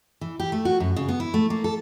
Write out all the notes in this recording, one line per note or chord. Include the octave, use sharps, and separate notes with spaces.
E3
G4
A3
F#4
F#2
C#3
B3
E4
A3
A#3
A4